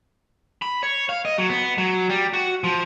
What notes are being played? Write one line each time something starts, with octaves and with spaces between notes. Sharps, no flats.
B5
C#5
F5
D#5
F#3
B3
F#3
G3
F#4
F3